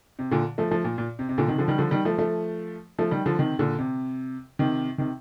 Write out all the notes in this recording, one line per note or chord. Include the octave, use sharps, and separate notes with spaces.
C3
A#2 D3
F3 A3
F3 A3
A#2
A#2
C3
C3
A#2 D3
C3 D#3
D3 F3
D#3 G3
D3 F3
D#3 G3
F3 A3
F3 A3
F3 A3
D#3 G3
D3 F3
C3 D#3
A#2 D3
C3
C3 D#3
C3 D#3